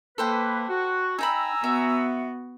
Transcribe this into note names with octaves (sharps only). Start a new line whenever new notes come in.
A#3 A4 B4 C5 G5
F#4
D#4 G5 G#5 A#5 B5 E6
B3 F#4 E5